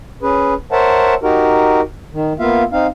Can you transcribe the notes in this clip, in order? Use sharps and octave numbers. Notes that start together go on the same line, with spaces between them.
C#4 G#4 B4
A#4 C5 C#5 E5 F#5 A5
D#4 F#4 G4 A#4
D#3
A#3 B3 F4 E5 F5
C4 D#4 F5